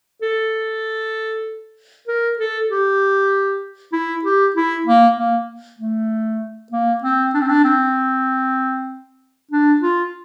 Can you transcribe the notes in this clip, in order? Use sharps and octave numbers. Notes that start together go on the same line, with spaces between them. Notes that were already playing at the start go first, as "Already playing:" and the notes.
A4
A#4
A4
G4
E4
G4
E4
A#3
A#3
A3
A#3
C4
D4
C4
D4
C4
D4
F4